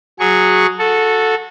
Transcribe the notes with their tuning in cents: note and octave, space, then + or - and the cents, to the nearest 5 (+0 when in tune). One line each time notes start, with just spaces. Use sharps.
F#3 -5 G#4 +0 C#6 +0
F#4 -20 A4 +0